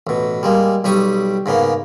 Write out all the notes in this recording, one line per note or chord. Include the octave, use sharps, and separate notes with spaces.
A1 B2
G3 G#3 A#3
B1 G3 G4 C#6 D#6
G#2 C#3 A#3 B3